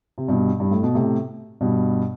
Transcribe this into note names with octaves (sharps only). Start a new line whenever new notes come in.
C3
G2 B2
G2
A2
B2
A2 C3
G2 B2